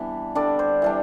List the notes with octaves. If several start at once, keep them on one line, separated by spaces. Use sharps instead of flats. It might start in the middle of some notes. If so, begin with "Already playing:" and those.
Already playing: E3 G3 B3 D4
D3 G3 D4 D5
C5
E3 G3 D4